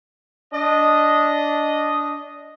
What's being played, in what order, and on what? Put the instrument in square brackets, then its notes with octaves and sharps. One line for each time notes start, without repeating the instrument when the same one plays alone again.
[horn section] D4 D#5